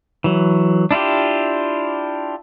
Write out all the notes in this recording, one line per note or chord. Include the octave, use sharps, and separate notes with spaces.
E3 F#3
D4 E4 F4 G4